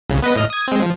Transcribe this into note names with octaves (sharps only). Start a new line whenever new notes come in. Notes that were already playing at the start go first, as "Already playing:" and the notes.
C2 C#3
B3 B4 D#5
A2 D#5 F6
D#6 G#6
G#3 C4
F3